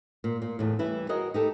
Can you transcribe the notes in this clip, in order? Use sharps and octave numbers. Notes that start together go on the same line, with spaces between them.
A#2
A#2
E2 A2
E3 G3 E4
F#4 G#4 A#4 D#5
D#4 G4 A4